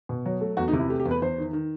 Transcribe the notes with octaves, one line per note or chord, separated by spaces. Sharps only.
B2
F#3
A3
E2 F#4
D#4
C3
E4
A3 G4
G4
E2
B4
E2 C5
D#3
D#3